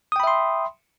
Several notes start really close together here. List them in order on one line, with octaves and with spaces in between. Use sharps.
D#6 G5 B5 E5 C6